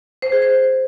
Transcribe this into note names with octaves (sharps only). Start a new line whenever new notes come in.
C5
G#4
C5